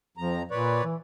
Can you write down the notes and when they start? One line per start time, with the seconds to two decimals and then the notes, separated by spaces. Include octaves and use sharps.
0.17 F2 F3 A#5
0.51 A#2 B4 C#5 D5
0.84 E3